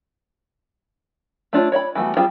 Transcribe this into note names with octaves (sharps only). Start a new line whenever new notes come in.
A3 D4 F4 C#5
C#5 D5 E5 B5
E3 G3 A3 B3 F#4
G3 C4 F4 G#4 C5